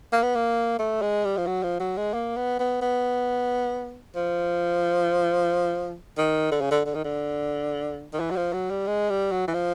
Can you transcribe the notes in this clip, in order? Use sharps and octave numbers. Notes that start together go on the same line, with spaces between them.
A#3
B3
A#3
A3
G#3
G3
F3
F#3
F3
F#3
G#3
A#3
B3
B3
B3
F3
D#3
D3
C#3
D3
D3
D#3
D3
D#3
E3
F#3
F3
F#3
G3
G#3
G3
F#3
E3
F3